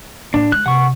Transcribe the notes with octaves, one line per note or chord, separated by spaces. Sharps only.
A2 A#3 D4
G#3 F#6
C3 F#5 C#6